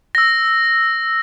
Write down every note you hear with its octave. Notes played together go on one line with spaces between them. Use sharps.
E6 A#6